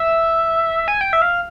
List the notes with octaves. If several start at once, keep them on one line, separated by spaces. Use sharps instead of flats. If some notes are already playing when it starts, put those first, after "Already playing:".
Already playing: E5
G#5
G5
E5
F5